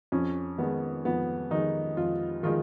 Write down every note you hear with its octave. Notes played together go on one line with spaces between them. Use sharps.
F2 C#4
D#3 G#3 B3
F2 B3
D#3 G#3 D#4
F2 F4
D#3 G#3 F4